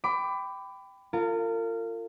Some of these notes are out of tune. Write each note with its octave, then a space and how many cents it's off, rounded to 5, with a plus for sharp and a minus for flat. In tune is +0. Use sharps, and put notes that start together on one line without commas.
G5 +0 B5 +25 D6 +0
F4 -15 A#4 -45